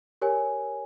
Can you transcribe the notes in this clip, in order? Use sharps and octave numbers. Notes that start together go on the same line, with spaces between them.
G4 A#4 C#5 G#5